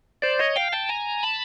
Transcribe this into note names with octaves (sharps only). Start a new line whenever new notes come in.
C5 D5
C#5 D#5
F5 G5
G5 A5
G#5 A#5
A5 B5